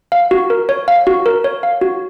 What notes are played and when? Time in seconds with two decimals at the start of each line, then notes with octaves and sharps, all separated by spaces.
0.12 F5
0.31 F#4
0.50 A#4
0.69 C#5
0.88 F5
1.07 F#4
1.26 A#4
1.44 C#5
1.63 F5
1.81 F#4